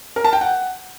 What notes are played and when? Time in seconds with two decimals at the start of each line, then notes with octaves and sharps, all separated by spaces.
0.16 A#4
0.24 A5
0.33 G5
0.41 F#5